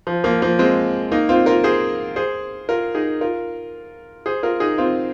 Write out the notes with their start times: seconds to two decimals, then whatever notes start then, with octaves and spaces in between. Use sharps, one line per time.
0.07 F3
0.24 F3 A#3
0.42 F3 A#3
0.59 G#3 C4
1.11 A#3 D#4
1.29 C4 F4
1.46 F4 A#4
1.64 G#4 C5
2.16 G#4 C5
2.69 F4 A#4
2.95 D#4 G#4
3.21 F4 A#4
4.26 G#4 C5
4.43 F4 A#4
4.60 D#4 G#4
4.78 C4 F4